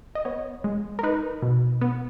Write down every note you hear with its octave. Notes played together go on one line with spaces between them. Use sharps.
D#5
B3 C#5
G#3
A#4
D#4 B4
B2
B3